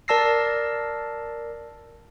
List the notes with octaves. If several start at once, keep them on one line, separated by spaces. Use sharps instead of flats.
A#4 D5 A5 E6 A#6 C7